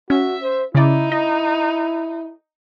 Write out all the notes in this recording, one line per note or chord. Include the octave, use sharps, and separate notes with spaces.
C#4 F#4 E5
C5
C#3 D#4 E4 D5
E4 D#5